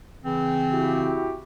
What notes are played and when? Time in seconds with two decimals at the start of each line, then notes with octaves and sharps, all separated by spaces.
0.25 C#3 E3 C4
0.71 E4 F#4 G4